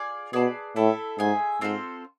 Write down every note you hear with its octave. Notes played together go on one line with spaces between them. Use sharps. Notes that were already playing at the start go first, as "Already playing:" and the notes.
Already playing: F4 G#4 D5
B2 G#4 B4 D5 A5
A2 E4 A4 E5
G#2 G#4 C5 E5 G#5
G#2 C4 F4 A4 C5